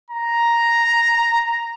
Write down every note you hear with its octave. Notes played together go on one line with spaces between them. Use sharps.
A#5